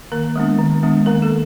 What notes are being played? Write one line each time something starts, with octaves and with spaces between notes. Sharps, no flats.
D#3 A#3 A#4
G#3 B3 D4
D#3
G#3 B3 D4
D#3 A#3 A#4
A3 A4